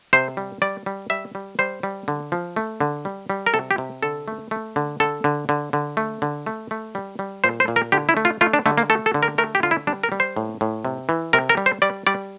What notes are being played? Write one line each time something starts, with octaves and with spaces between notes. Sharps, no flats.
C3 C5
G3
G3 D5
G3
G3 E5
G3
G3 C5
G3
D3
F3
A3
D3
G3
G3
A#4
C3 A4
G4
C3
D3 A4
A3
A3
D3
D3 A4
D3
D3
D3
A3
D3
A3
A3
G3
G3
A#2 C5
C5
A#2
A#4
D3 G4
E4
A3
F4
A3 F4
D4
D3 A3
A#3
A3 A4
A4
D3
A#4
A3 A#4
G4
D3 F4
E4
G3 D4
A#4
G3
C5
A2
A2
C3
E3
C3 A#4
A#4
G3
C5
G3 D5
G3 D5